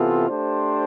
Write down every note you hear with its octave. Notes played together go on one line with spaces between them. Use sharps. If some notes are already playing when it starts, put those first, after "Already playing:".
Already playing: C3 E3 B3 F4 A4
A3 D4 G4 C5